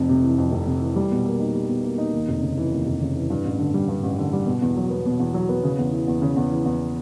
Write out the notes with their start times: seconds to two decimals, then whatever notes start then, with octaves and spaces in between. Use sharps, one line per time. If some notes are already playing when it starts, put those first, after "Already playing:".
Already playing: F1 F2
0.09 C3
0.23 E3
0.38 F2
0.52 F1
0.67 C3
0.82 E3
0.96 G3
1.11 B2
1.25 A#3
1.40 D#4
1.54 G3
1.69 B2
1.84 A#3
1.98 D#4
2.13 D#2
2.28 F1
2.42 C#3
2.57 E3
2.71 D#2
2.86 F1
3.01 C#3
3.15 E3
3.30 G2
3.45 A1
3.59 D3
3.74 G3
3.88 G2
4.03 A1
4.18 D3
4.33 G3
4.47 B2
4.62 E2
4.77 F#3
4.90 B3
5.06 B2
5.20 E2
5.34 F#3
5.49 B3
5.64 C#3
5.79 E2
5.93 E3
6.08 E2
6.22 C#3
6.36 E2
6.52 E3
6.66 E2